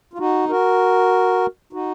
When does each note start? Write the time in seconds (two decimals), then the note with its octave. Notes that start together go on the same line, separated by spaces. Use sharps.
0.13 F4
0.18 D#4 F#4
0.49 F#4 A#4
1.73 D#4 F#4